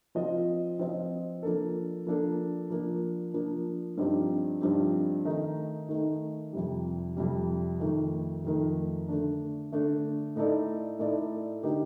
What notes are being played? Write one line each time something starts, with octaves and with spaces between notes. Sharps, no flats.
F3 C4 F4 C5 D#5
F3 C4 F4 C5 D#5
F3 A#3 D4 A4
F3 A#3 D4 A4
F3 A#3 D4
F3 A#3 D4
G2 F3 C4 D#4 G4
G2 F3 C4 D#4 G4
D#3 A3 D#4
D#3 A3 D#4
F2 C3 G3
F2 C3 G3
F2 D#3 A3
F2 D#3 A3
D3 A3 D4
D3 A3 D4
A2 A3 D#4 A4 D5
A2 A3 D#4 A4 D5
D3 A3 D#4 G4 A#4